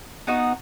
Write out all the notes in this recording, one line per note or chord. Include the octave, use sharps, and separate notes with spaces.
B3 D#4 F#4